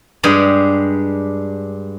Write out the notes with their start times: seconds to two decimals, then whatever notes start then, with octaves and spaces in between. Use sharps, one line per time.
0.23 G2 G#3 G4 G#4 B5